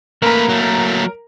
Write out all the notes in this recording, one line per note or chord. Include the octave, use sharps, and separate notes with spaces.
A3 A#3 A#4 B4 A#5
F#3 A3